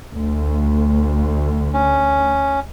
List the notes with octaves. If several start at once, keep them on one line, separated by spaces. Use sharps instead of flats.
D2
C#4